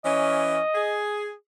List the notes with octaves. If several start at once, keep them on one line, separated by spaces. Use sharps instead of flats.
E3 C#4 D#5
G#4